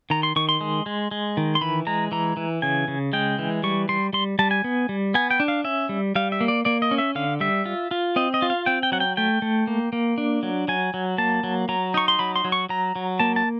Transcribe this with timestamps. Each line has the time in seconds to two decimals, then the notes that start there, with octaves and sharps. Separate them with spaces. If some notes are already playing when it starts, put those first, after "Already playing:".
0.10 D#3 A#5
0.23 C6
0.36 D#3 C#6
0.49 C6
0.61 G#3
0.86 G#3
1.11 G#3
1.37 D#3
1.55 C6
1.61 E3 B5
1.87 G#3 A#5
2.12 E3 A#5
2.37 E3
2.62 C#3 G#5
2.88 C#3
3.13 G#3 G5
3.39 E3
3.63 G3 C#6
3.89 G3 C6
4.13 G3 C6
4.39 G3 A5
4.51 G#5
4.64 B3
4.89 G3
5.14 B3 G#5
5.31 G5
5.40 D4
5.48 F5
5.64 C#4 E5
5.89 G3
6.15 G3 F5
6.32 E5
6.41 A#3
6.48 D5
6.65 A#3 D5
6.82 D#5
6.91 C#4
6.98 E5
7.15 D3 F5
7.40 G3 E5
7.66 F4
7.91 F4
8.16 C4 D#5
8.34 D#5
8.42 F4
8.50 F5
8.66 C4 G5
8.83 G5
8.92 F#3 F#5
9.00 G5
9.17 A3 G5
9.42 A3
9.67 A#3
9.93 A#3
10.18 D4
10.43 F#3
10.68 F#3 G#5
10.94 F#3
11.18 A#3 A5
11.44 F#3
11.69 F#3 A#5
11.94 D#4 C#6
12.08 C6
12.19 F#3 B5
12.36 C6
12.45 F#3
12.52 C#6
12.69 F#3 A#5
12.96 F#3
13.20 A#3 A5
13.36 A5